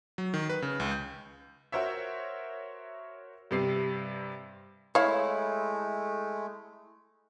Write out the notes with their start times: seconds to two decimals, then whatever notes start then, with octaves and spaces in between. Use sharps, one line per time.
0.18 F#3
0.34 D#3
0.49 B4
0.62 C#3
0.80 C#2
0.91 G6
1.72 F#4 A#4 C5 C#5 E5
3.51 G2 C3 C7
4.95 G#3 A3 E4 C#5 F5